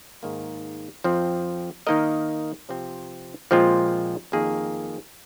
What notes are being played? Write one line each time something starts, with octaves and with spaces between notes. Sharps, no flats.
G#2 D#3 A#3
F2 F3 C4
D#3 A#3 D#4 A#4 D#5
C3 F3 C4
A#2 F3 G#3 C4 F4
F2 D#3 A#3 G#4